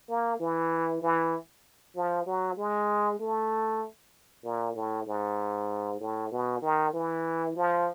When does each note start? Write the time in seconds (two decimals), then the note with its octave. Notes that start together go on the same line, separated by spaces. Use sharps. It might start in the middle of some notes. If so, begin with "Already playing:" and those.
0.09 A#3
0.40 E3
1.02 E3
1.95 F3
2.26 F#3
2.57 G#3
3.20 A3
4.44 A#2
4.75 A2
5.07 G#2
6.00 A2
6.32 B2
6.62 D#3
6.93 E3
7.56 F3